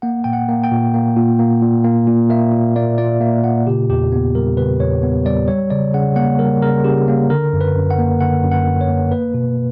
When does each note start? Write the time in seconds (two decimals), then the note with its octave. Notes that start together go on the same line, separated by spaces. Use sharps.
0.02 A#3 F#5
0.24 A#2 G5
0.33 F#5
0.49 A#3
0.63 G5
0.71 A#2
0.94 A#3
1.16 A#2
1.39 A#3
1.62 A#2
1.84 A#3
2.07 A#2
2.30 A#3 E5
2.52 A#2
2.76 A#3 D5
2.98 A#2 D5
3.21 A#3 E5
3.44 A#2 F#5
3.67 C#3 G4
3.89 E2 G4
4.12 B3
4.35 G3 A#4
4.57 C#3 B4
4.80 E2 C#5
5.03 B3
5.25 G3 D5
5.48 G3 C#5
5.70 C#3 D5
5.94 C#3 F#5
6.16 A#3 F#5
6.39 G3 A#4
6.62 C#3 A#4
6.84 C#3 G4
7.08 A#3
7.30 D3 A#4
7.53 F#2
7.61 B4
7.76 F#2
7.90 F#5
7.99 A#3
8.21 D3 F#5
8.43 F#2
8.51 F#5
8.67 F#2
8.81 C#5
8.90 A#3
9.12 A#3 B4
9.34 B2